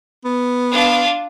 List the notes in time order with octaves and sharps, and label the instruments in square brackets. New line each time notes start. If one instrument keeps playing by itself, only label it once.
[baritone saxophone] B3
[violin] D4 F4